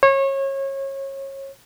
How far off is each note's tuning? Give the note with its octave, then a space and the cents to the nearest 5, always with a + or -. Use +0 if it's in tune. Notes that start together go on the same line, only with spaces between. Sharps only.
C#5 -30